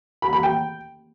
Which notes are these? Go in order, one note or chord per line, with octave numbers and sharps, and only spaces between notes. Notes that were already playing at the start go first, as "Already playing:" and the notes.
B5
B5
G5